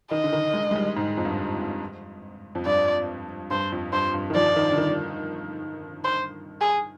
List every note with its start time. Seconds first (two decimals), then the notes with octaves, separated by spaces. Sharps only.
0.11 D#3 D#5
0.24 D3
0.33 D#3
0.54 G#3
0.71 G#3
0.75 G3
0.97 G#2
1.17 F2
1.25 G2
2.55 F2
2.66 G2 D5
3.51 G2 C5
3.72 F2
3.92 G2 C5
4.14 G2
4.30 D#3
4.35 F3 D5
4.56 D#3
4.71 D3
4.78 D#3
6.04 C5
6.61 G#4